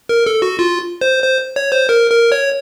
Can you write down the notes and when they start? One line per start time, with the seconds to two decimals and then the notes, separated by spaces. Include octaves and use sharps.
0.09 A#4
0.26 A4
0.42 F#4
0.59 F4
1.01 C5
1.23 C5
1.56 C#5
1.72 C5
1.89 A#4
2.11 A#4
2.32 C#5